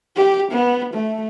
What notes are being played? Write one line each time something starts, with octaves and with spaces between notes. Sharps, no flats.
G4
B3
A3